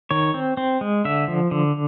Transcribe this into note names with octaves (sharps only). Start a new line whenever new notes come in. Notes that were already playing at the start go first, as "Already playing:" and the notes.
D#3 C#5
C4
C4
G#3
D3 E5
F3
D3